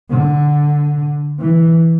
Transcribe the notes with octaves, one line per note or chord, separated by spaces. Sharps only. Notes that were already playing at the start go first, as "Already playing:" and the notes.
D3
E3